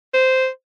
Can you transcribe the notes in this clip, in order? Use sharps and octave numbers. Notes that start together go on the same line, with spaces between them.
C5